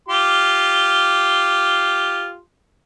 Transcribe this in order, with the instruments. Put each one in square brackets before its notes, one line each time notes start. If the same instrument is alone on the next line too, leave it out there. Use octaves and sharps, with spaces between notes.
[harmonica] F4 G4 C6